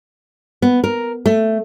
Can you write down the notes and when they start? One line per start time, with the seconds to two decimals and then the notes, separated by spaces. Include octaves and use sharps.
0.62 B3
0.84 A#4
1.26 A3